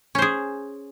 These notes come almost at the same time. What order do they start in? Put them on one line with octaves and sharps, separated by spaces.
C#4 C5 G#4